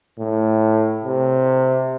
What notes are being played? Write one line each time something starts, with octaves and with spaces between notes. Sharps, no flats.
A2
C3